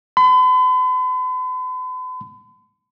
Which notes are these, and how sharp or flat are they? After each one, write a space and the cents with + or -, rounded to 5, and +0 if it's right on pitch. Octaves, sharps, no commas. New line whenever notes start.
B5 +45